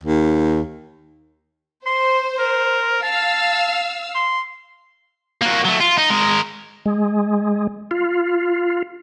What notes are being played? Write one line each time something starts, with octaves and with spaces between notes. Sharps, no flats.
D#2
C5 C6
A#4
F5 A5 E6
C6
A#3 F#4
F#3 A3
F4
D#4
G#3 A#4
G#3
F4